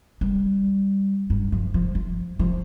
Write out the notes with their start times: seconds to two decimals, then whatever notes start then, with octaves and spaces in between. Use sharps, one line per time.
0.21 G3
1.30 G2
1.52 F3
1.74 F3
1.95 F3
2.39 F3